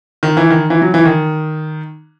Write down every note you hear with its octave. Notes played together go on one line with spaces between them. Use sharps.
D#3
E3
D#3
E3
F#3
E3
D#3